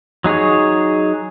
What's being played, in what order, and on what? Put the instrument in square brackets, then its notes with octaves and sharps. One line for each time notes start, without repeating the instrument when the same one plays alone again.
[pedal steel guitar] F#3 D#4 G#4 C#5